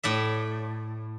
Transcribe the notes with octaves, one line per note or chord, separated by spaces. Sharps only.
A2 D5 E5